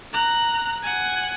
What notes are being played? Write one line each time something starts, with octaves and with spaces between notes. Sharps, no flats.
A#5 F#6
F#5 G#5